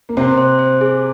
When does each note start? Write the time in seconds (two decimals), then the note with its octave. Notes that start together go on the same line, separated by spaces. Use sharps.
0.09 A#3
0.17 C3 C4 C5
0.38 C5
0.59 C5
0.81 G#4